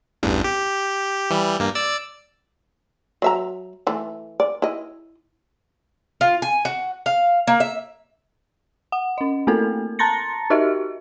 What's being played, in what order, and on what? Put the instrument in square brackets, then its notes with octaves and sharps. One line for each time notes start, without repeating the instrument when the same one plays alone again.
[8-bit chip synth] A1 E2 G2
G4
E3 G3
G2 A#3
D5 E6
[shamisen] F#3 E5 A#5
E3 A3
D5
E4 D#5
[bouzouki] F4
G#5
F#4
F5
A#3
E5
[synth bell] F#5
C#4 D#5
A3 A#3 C4 E4 A4 A#4
A5 A#5 C6 A6 A#6 C#7
D#4 F#4 G4 A#4 D#5 E5